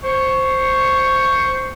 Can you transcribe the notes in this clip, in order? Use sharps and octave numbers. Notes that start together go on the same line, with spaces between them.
C5 C#6